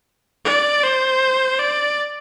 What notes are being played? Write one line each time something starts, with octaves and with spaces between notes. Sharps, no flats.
D5
C5
D5